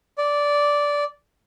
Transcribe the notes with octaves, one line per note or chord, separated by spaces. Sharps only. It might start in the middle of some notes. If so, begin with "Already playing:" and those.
D5